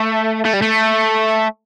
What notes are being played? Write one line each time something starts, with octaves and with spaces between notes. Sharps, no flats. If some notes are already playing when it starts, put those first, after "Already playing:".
Already playing: A3
A3
G3
A3